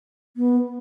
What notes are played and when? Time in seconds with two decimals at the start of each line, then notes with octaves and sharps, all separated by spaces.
0.37 B3